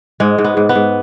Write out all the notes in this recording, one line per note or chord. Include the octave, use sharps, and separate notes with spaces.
G#2 G#3
G#2
B3
G#2
B3
G#2